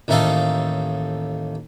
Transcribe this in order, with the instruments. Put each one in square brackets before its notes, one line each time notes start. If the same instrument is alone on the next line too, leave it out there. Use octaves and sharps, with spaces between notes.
[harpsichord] A1 D#2 A3 D#4 A4 F5